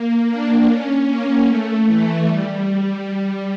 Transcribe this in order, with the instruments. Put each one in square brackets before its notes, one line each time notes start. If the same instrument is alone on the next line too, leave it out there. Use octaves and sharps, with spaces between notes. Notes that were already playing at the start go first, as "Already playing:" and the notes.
Already playing: [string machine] A#3
D4
C#4
A#3
A3
E3
G3